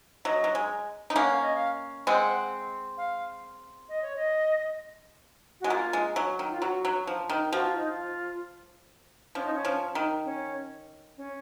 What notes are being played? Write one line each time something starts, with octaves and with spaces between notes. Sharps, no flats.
F#3 D#5
F#3
G#3
D#4
A#3 C#4 F#5
F5
D#5
F5
G#3 C4 F#5
F5
D#5
C#5
D#5
G#3 F#4
A#3 F4
G#3
F#3
D#3
F4
F#3 F#4
F#3
F3
D#3
F3 F#4
F4
D#4
F4
F3 C#4
D#4
C#4
F3
D#3
C#4
C#4